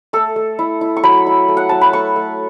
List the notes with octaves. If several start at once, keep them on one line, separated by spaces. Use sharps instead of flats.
A3 A4
A3
E4
E4
C#6
F#3 B5
E4
A3
F#5
F#3 A5
B5
A3 C#6
A3